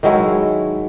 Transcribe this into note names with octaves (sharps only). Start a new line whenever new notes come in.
D#3 F#3 G#3 E4